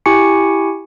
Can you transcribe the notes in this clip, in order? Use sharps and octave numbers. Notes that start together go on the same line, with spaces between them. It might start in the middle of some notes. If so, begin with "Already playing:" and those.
E4 G4 G#5 C#6 C#7